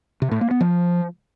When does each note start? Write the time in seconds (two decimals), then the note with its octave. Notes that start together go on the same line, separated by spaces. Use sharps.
0.22 C3
0.31 A2
0.41 A#3
0.51 B3
0.61 F3